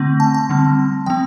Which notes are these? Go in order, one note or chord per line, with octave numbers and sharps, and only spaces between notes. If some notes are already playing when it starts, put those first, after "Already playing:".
Already playing: D3 A3 C4
A5
A5
D3 G3 C4
F3 C4 G5